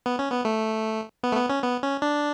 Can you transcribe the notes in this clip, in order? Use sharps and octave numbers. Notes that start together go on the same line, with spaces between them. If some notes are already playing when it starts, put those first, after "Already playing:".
B3
C#4
B3
A3
B3
A3
B3
C#4
B3
C#4
D4